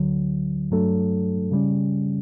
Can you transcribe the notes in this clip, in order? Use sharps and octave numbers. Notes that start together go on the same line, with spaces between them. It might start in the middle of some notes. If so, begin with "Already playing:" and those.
Already playing: D2 D3 F#3
G2 F#3 A3 D4 A4
C#3 G3 C#4